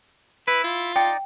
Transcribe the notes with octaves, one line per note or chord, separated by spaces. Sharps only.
E4 B4
F4
D#4 D5 G5